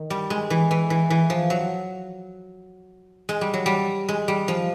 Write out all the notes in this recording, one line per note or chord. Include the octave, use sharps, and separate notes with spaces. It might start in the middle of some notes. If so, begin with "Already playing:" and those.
Already playing: D#3
G3
G#3
E3
E3
E3
E3
F3
F#3
G#3
G3
F#3
G3
G#3
G3
F3